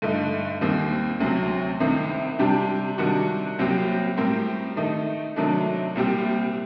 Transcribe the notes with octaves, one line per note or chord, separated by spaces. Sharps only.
G2 D3 A3 D#4
D#2 D#3 G3 C4
D2 C3 F#3 C4
C2 C3 D#3 A3 C4
C3 G3 D4 G4
C3 D#3 G3 D4 F#4
C2 A#2 F#3 C4 G4
A2 G3 C4 G4 A#4
D#3 A3 D#4
C3 D#3 F#3 A3 D4
C2 A#2 G3 C4 G4